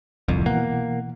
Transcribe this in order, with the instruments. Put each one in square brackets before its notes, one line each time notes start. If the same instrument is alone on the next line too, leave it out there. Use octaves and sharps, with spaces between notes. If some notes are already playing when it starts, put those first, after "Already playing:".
[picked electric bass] D1 C2 F2
[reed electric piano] B2 E3 F#5 [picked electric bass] A#3